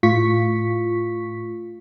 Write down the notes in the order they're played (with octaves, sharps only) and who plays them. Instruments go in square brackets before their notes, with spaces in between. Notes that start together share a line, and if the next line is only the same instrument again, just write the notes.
[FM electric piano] A2 F4 C#6 B6